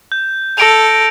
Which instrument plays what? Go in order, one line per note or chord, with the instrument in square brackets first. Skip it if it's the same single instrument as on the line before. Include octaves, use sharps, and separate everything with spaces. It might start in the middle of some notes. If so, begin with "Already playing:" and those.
[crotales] G6
[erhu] A4 [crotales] A#6 D7 F7